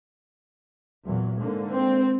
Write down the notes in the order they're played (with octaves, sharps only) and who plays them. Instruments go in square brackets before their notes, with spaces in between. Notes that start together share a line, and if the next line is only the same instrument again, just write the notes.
[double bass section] E2 A#2 F#3
G#2 D3 A#3
[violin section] C4